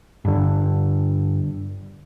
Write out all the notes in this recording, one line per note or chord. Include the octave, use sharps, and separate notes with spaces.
G2 D3